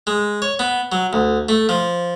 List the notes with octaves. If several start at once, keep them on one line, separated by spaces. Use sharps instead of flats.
G#3
C#5
B3
F#3
D2
A3
F3